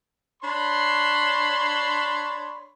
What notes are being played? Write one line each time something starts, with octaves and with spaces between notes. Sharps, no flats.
D4 C#5 B5 C6